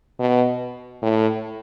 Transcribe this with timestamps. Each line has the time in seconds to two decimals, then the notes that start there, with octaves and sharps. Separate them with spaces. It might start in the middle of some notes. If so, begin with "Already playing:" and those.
0.19 B2
1.02 A2